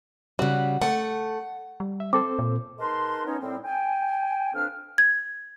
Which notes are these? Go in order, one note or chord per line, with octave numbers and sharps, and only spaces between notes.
C#3 G3 F#4
A3 F#5
G3
E5
C4 A4 C5 D6
A#2
G#3 D#4 A#4 B4 A5 C6
B3 C#4 D#4 C#5
A2 G3 C4
G5 G#5
F2 C4 D4 B4 F5 F6
G#6